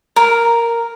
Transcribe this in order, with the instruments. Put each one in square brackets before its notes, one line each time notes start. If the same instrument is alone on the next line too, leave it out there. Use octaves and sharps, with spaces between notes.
[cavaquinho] A#4